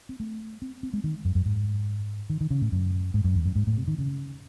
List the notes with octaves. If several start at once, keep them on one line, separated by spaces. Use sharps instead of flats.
C4
A3
C4
C4
G#3
D#3
F#2
F#2
G#2
D#3
D#3
C#3
A2
F#2
G#2
F#2
E2
F#2
G#2
A2
C3
D#3
C#3